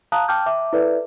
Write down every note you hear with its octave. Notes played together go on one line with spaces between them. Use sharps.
F5 A5 A#5 D#6 F#6
G5 A5 D6 F6 G6
E5 D6
E4 A4 B4 D5 E5